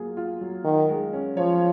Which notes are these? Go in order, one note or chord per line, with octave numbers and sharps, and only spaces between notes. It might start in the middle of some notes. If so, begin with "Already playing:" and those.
Already playing: F#3 A#3 F4 G#4
F4
F#3
D#3 F#4
G#3
C#4
F3 C#5